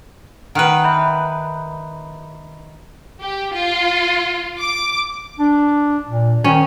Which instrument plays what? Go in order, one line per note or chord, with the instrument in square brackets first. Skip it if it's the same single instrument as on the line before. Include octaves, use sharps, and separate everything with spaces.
[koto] D#3 B4 [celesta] F#5 F6 F#6
[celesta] E5 B5 G6
[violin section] G4
F4
D6
[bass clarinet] D4
A#2
[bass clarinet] D#3 [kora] C#4